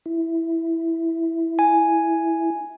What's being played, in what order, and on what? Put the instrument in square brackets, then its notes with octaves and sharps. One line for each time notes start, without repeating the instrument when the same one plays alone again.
[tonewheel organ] E4
[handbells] G#5